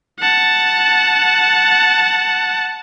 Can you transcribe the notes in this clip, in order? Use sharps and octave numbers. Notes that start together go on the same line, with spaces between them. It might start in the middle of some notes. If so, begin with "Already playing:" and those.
F#5 A5